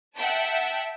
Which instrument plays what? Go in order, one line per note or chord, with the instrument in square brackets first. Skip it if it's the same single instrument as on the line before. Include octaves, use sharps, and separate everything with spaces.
[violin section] E5 F#5 G5 A5